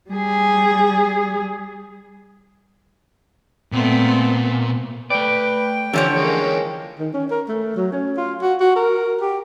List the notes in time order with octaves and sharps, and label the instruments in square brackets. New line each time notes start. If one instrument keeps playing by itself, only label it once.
[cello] G3 G#4
[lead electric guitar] A#2 [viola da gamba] A3 B3 C4
[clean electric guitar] A3 D5 [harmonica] B4 [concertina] G5
[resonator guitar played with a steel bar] D3 F3 C#5 [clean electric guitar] E3 [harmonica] C#4 G4
[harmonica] G#3 A#3 C#4
[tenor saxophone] D#3
C#4
A#4
A3
F#3
C#4
F4
F#4
F#4
A#4
G4